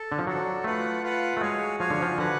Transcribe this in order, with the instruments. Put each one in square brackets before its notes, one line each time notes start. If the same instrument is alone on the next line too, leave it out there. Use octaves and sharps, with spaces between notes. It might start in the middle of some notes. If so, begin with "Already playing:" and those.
Already playing: [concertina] A4
[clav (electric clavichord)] D3
F3
[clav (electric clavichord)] F#3 [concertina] D4 F#4 A4
[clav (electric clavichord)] A3 [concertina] F4 B4 F#5
[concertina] F4 B4 F#5
[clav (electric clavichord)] A3
[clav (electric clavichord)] G#3 [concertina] F#4 C#5 F5 G#5
[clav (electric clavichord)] F3 [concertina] F#4 C#5 F5 G#5
[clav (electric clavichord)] D3
F3
[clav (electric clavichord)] D3 [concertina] F#4 B4 F#5